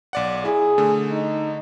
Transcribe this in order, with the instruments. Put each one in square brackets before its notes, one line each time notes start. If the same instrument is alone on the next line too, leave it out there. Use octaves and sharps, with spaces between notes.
[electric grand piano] B1 D5 F#5
[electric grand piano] E4 [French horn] G#4
[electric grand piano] D3 A3
[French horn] D#4